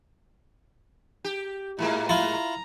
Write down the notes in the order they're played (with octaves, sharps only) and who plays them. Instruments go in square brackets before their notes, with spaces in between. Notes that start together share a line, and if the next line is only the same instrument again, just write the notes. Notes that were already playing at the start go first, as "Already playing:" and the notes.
[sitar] G4
[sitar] A2 G#3 A#3 [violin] E4
[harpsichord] E4 F4 [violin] A#5